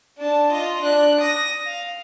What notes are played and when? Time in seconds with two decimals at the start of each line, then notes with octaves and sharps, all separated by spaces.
0.18 D4 A5
0.52 F4 D#5
0.82 D4 F#6
1.21 D#6 A#6
1.66 F5